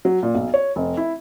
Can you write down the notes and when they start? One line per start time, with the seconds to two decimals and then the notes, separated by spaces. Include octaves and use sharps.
0.05 F#3
0.23 A#2
0.35 B1
0.54 C#5
0.76 F1
0.97 E4